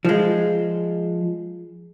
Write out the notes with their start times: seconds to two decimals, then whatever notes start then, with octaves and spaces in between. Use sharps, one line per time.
0.05 F3 G#3